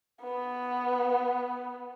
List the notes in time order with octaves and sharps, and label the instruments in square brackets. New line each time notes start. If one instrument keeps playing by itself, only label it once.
[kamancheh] B3